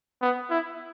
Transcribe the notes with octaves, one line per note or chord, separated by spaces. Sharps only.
B3
E4